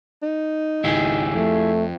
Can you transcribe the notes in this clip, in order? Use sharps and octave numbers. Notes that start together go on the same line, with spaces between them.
D#4
G#1 C#2 E4 G4 G#4
F2 A3